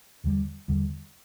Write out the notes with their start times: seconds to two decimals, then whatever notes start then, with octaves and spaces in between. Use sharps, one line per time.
0.24 E2 D3 G3
0.68 E2 D3 G3